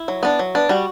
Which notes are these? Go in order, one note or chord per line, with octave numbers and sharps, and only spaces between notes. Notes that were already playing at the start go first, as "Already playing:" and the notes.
Already playing: E4
F#3
B3 D4
F#3
B3 D4
G3 F#4